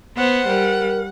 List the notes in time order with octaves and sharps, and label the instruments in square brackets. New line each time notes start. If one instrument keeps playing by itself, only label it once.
[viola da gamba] B3 C5 [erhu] F#5
[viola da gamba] G3 [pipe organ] A#4